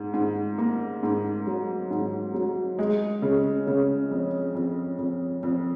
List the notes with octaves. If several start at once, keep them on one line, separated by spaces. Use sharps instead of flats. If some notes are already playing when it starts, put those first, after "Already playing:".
Already playing: G#2
G#2
A#3
G#2
F#3
G#2
F#3
G#3
C#3
C#3
F2
F2
F2
F2